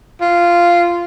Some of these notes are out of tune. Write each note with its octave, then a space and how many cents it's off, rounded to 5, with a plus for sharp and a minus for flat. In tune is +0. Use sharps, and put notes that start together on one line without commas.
F4 -10